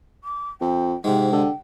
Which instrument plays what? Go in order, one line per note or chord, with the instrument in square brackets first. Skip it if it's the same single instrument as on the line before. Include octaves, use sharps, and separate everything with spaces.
[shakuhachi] D6
[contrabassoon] F2 [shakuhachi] G5
[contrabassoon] G#2 [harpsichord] C3 G#3 [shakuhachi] G5
[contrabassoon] D3